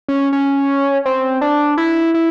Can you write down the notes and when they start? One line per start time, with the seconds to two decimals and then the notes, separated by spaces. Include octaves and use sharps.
0.08 C#4
0.33 C#4
1.05 C4
1.41 D4
1.77 E4
2.14 E4